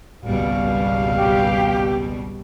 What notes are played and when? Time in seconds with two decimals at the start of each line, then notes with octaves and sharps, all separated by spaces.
0.25 G#1 C#2 B2 G3 F5
1.16 G4